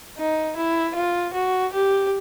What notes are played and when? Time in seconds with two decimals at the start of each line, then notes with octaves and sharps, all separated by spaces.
0.18 D#4
0.57 E4
0.95 F4
1.34 F#4
1.73 G4